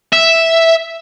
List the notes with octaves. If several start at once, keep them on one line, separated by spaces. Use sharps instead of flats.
E5